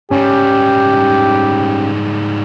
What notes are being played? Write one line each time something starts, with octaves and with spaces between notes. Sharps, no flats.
G#2 G3 C#4 G4